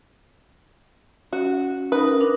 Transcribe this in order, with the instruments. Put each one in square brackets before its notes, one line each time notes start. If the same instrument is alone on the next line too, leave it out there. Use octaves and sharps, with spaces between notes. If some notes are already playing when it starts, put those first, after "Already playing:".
[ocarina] C#4 [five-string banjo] F#4
[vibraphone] D#4 A#4 [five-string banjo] B4
[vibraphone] D4 D#4 A#4